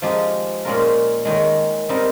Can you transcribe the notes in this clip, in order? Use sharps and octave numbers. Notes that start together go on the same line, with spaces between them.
F3 G#3 D#4 G4
A#2 G#3 C#4 F4 A#4
D#3 G#3 D#4 A#4 C#5
G3 C4 D#4 A#4